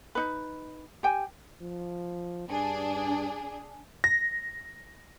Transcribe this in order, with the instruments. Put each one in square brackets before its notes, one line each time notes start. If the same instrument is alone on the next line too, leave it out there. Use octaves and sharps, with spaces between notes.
[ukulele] D#4 B4
G4 G5 G#5
[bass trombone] F3
[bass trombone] G2 [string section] D4 G#4
[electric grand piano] A#6